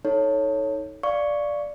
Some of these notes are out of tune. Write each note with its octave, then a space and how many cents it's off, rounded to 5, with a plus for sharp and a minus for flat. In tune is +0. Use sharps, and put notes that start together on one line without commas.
D#4 +15 A4 +0 C#5 +0
D5 +0 F5 +0 C#6 +5